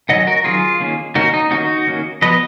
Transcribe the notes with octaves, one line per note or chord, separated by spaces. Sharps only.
D#3 F#3 C#4 D#5 F#5
F#4 A#4
D#3 F#3 C#4 F4 G#4
D#3 A#3 C#4
D#3 A#3 C#4 D#4 F#4
D#4
D#3 A#3 C#4 D#4 F#4
D#3 A#3 C#4
F3 B3 B4 D#5